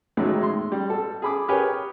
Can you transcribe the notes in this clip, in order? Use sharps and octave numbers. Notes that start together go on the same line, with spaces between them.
E2 A2 D#3 F#3 G#3 A3
C6
G3
A4
G#4 B5 D6
G4 G#4 A#4 B4 C#5 G#5